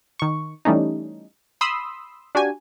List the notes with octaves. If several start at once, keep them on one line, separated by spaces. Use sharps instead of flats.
D#3 C#6
E3 G3 A3 C#4 D#4
B5 C6 D#6 E6
D4 F#4 G4 G#5